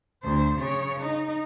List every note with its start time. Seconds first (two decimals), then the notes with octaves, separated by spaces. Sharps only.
0.23 D2 C5
0.59 C#3 C#5
1.00 D#4